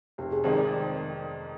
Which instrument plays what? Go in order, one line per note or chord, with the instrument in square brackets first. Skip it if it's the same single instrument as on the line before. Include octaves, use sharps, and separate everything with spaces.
[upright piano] F1 [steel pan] G4
[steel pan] G#4
[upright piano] F2 D#3 G#3 D#4 [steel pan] C5
[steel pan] D5